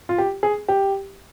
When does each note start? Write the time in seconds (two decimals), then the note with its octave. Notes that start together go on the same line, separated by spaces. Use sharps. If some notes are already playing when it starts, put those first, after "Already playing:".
0.09 F4
0.18 G4
0.43 G#4
0.68 G4